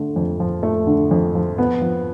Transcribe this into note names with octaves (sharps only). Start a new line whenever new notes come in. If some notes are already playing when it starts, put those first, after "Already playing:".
Already playing: D3 A3
F2
F3
A3
D3
F2
F3
B3
F3